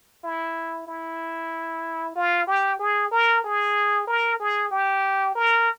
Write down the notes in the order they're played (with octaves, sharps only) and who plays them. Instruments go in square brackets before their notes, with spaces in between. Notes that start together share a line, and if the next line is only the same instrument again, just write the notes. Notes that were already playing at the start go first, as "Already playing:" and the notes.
[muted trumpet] E4
E4
F4
G4
G#4
A#4
G#4
A#4
G#4
G4
A#4